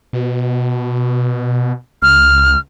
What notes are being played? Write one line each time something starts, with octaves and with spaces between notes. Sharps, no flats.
B2
C#2 F6